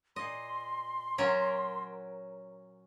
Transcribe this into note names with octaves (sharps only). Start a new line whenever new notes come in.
A#2 D#5 C6
F#3 C#4 A#4